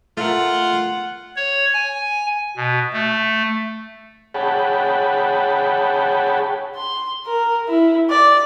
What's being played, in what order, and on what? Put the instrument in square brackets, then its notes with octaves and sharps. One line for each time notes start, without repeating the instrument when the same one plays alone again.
[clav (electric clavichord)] A3 A#4 [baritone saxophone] F4 [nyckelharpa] F#5
[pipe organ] C#5
G#5
B2
A3
[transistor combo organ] G#4 C#5 F#5 G5 A5 B5
[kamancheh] C6
A#4
E4
D5